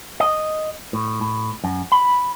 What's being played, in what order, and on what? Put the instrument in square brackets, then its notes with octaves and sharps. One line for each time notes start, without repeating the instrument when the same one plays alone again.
[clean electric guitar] D#5
A2
A2
F#2
B5